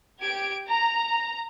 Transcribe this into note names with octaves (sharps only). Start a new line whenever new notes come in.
G4 G#6 D7
A#5